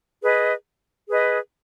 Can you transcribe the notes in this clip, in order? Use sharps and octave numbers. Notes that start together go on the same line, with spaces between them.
G#4 B4 D#5
G#4 B4 D#5